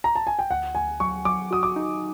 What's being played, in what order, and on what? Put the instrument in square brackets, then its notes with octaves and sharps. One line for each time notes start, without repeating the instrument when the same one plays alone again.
[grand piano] A#5
A5
G#5
G5
[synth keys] D2 [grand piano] F#5
[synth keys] D2 [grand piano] G#5
[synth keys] F#3 [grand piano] C#6
[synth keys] F#3 [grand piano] D6
[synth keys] F#4 [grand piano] D#6
[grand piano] D6
[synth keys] D#4